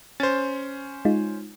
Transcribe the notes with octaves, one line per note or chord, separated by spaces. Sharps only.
C#4 C5 A6
G#3 D#4 F4